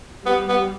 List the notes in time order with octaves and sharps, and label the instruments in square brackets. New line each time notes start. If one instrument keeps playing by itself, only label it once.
[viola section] G3 [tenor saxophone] B3
[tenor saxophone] B3